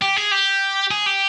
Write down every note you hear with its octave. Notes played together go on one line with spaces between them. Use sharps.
G4
G#4
G4
G#4
G4